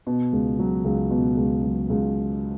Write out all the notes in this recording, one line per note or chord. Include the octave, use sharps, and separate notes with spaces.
B2
C#2
F#3
C#2
B2
C#2
F#3
C#2